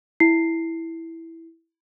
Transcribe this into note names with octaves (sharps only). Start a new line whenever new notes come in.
E4 C7